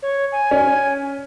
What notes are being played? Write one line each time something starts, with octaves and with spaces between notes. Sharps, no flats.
C#5
G#5
C#4